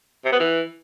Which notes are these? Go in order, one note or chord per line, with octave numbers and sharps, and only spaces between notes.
C3
B3
E3